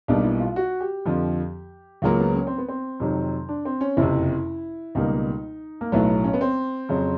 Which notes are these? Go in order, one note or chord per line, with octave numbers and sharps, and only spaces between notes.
B1 B2 G3 A#3 D4
E4
F4
F#4
G4
F2 D3 F3
C#2 C#3 F#3 A#3 F4
B3
C#4
C4
B3
C4
F2 C3 D#3 F#3
D4
C4
C#4
F#1 F2 C3 E4
C#2 B2 G3 A#3 D#4
A#3
B1 A2 F#3 A3 B3
C#4
B3
C4
F2 C#3 F#3